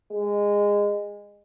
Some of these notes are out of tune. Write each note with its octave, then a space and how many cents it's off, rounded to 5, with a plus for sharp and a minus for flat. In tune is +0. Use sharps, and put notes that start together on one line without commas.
G#3 -20